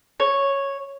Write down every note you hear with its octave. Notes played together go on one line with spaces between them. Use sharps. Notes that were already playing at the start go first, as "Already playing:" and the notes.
C#5